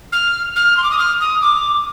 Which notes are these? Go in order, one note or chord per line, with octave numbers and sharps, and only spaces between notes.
F6
F6
C6
D6
D#6
F6
D#6
D6